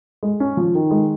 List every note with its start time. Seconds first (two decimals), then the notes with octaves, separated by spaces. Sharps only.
0.23 G#3
0.40 C#4
0.57 F3
0.75 D#3
0.91 G#3